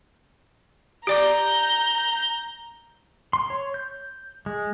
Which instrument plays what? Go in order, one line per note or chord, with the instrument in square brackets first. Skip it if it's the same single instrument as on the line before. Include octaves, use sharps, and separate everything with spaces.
[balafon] G4 D5 D6 [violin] A#5 G6
[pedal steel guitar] C6
C#5
G6
G#3